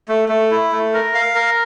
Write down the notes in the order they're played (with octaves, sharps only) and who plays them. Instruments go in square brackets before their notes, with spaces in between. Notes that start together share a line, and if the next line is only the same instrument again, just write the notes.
[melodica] A3
A3
E4
A3
A#4
F5
A#4